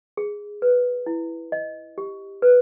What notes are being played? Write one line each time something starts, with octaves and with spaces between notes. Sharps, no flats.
G#4
B4
E4
D#5
G4
B4